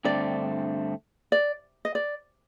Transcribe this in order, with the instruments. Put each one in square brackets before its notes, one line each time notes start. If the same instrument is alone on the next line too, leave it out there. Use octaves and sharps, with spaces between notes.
[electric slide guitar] G2 D3 A3 C4 [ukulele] D5
[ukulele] D5
D#5
D5